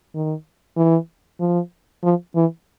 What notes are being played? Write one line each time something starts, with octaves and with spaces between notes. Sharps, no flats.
D#3
E3
F3
F3
E3